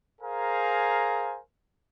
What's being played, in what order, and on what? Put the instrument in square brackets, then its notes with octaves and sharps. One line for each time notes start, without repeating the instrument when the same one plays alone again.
[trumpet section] G#4 A#4 C5 F5 G#5 A#5